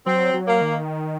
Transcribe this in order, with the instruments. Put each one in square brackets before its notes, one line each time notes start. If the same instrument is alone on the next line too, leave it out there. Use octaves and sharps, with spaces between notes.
[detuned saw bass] F#3 [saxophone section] C4
[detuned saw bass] F#3
[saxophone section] A#3
[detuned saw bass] D#3